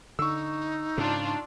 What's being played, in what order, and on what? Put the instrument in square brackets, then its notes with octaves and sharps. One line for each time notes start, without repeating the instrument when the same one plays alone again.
[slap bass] D3 [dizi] D#4 [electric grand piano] C#6 E6
[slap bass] G#2 C#3 [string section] D4 F4